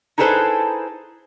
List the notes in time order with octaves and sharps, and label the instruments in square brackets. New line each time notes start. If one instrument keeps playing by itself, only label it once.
[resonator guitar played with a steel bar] D#4 E4 G#4 A4 B4 C5